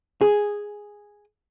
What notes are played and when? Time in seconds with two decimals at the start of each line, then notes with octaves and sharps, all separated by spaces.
0.21 G#4